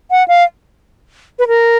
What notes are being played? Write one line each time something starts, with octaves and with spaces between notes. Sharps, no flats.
F#5
F5
B4
A#4